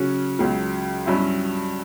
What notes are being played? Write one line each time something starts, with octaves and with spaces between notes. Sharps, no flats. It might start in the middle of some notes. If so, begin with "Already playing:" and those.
Already playing: C#3 F#3 C#4 F#4
C#2 C#3 F#3
G2 F#3 C#4 E4